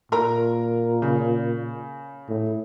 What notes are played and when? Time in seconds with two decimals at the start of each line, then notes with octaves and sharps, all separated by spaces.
0.12 A#2 A#4 A#5
1.02 C#3
2.29 A2